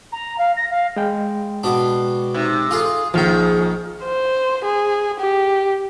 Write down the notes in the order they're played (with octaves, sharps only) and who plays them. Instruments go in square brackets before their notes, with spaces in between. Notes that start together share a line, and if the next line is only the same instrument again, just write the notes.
[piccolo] A#5
F5
A#6
F5
[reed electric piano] G#3 G5
[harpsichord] B2 D4
[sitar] C3 [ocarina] D#4
[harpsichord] F4 G#4 [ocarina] A4
[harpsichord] A#1 G5 [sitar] D#3 [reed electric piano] F3 F6 [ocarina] G#4
[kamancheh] C5
G#4
G4